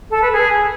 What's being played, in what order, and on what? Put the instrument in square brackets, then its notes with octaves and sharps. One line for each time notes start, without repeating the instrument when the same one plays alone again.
[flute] A4
B4
G#4